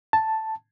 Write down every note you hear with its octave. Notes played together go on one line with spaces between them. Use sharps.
A5